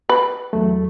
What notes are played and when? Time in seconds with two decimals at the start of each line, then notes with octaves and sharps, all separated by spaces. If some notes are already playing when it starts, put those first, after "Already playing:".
0.09 B4
0.53 E2 F#3 A3